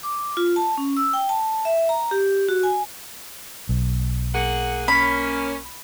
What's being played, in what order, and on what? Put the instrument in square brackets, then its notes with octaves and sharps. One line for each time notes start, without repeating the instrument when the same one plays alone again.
[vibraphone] D6
F4
A5
C#4
E6
G5
A5
E5
A#5
G4
F#4
G#5
[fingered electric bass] B1
[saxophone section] A#3 G#4 F#5
[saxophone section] A#3 C#4 [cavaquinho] B5